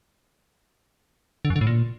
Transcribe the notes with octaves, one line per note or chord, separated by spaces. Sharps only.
D3
F#2
D3
A2
A#2